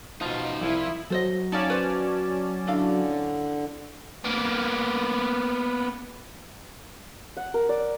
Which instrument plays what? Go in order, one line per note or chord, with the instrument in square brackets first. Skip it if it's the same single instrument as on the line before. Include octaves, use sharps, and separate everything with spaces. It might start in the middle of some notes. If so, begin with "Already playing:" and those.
[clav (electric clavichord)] B2 F3 [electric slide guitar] D#4 F4
[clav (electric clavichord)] C2 [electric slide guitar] F3 [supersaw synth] E4
[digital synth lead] F#3 [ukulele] A4 C5 D#5
[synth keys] C#4 D5 A5 [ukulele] D#4 F5
[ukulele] B4 C5
[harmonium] D3 [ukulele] D4 E4 F5
[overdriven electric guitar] A#3 B3
[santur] F#5
A#4
D5